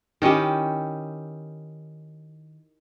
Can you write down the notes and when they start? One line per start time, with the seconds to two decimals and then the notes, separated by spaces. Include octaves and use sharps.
0.22 D#3 C#4 E4 G4